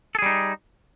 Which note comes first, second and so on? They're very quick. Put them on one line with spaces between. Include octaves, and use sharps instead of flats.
A4 G#4 G3 D#4